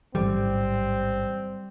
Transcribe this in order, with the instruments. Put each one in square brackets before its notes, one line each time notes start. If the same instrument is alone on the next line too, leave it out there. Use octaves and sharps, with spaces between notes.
[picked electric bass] A1 G#2 E3 [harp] G3 [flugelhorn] C4